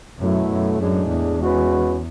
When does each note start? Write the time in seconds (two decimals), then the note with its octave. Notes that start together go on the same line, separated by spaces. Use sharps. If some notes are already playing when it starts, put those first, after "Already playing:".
0.19 F#2 B2 F#3 A3 E4
0.49 F#2
0.79 F#2 A2 G#3 D4 G#4
1.09 E2
1.39 G#3 C#4 F#4 B4